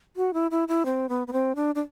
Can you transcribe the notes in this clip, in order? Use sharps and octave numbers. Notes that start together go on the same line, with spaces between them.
F#4
E4
E4
E4
C4
B3
B3
C4
D4
D4